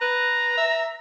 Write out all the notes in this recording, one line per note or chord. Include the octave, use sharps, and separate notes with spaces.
B4 A#5
E5